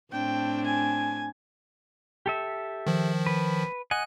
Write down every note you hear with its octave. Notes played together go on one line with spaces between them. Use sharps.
A2 C4 D4 G5
G#5
G4 A4 E5
D#3 F3
B4
D#5 F#5 G#5 F#6